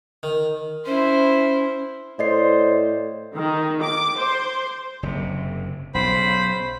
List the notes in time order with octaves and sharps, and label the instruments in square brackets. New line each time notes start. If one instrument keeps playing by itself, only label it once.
[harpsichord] D#3
[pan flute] C#4 [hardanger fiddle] E4 C5
[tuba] A2 [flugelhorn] C5 [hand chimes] D5 D#5 C7
[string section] D#3
D6
C5
[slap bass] F#1 C3
[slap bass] B1 C#3 [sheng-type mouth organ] C5 B5